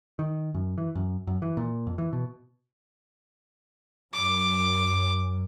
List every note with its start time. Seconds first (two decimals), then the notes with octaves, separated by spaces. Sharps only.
0.19 D#3
0.54 F#2
0.78 E3
0.95 F#2
1.27 F#2
1.42 E3
1.57 A#2
1.87 F2
1.98 E3
2.13 B2
4.14 F#2 D6